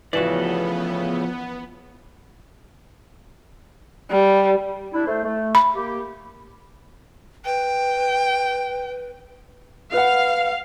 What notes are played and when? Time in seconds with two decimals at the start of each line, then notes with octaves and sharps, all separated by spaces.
0.13 A2 C#3 E3 F3 B3 F#4 A4 D5
4.11 G3
4.94 D4 E4
5.07 A3 C5
5.24 A3
5.55 B5
5.75 A#3 G4
7.45 B4 G5
9.93 B4 F5 F#5